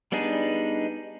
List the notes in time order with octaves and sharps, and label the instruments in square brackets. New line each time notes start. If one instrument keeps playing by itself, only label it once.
[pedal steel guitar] G3 B3 D4 D#4 G#4